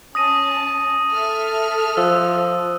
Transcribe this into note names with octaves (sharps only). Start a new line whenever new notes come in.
C#4 A5 D#6 A#6 D#7
A4 E5 F6
F3 E6 F#6